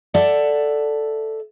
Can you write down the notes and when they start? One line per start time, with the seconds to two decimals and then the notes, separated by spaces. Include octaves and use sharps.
0.14 A4 D5 E5 F#5